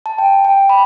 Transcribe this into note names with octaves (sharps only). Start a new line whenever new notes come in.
A5
G5
G5
B5